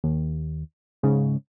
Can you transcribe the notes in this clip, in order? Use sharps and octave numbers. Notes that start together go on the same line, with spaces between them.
D#2
G#2 C#3